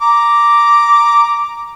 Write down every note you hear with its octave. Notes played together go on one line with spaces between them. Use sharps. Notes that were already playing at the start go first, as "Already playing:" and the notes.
A#5 D6